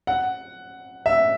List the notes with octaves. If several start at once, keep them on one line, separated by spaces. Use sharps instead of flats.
F#5
E5